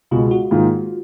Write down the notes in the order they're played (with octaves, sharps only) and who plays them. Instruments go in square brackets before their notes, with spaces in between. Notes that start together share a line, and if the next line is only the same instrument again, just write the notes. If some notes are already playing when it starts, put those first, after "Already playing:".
[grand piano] C#2 B2 G#3 [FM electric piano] F4
[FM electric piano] F#4
[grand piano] G#2 D#3 A#3 F4